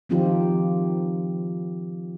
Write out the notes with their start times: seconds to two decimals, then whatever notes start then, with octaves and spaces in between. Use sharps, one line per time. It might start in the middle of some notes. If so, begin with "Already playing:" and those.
0.09 D#3 F3 C4 D#4 F4 G4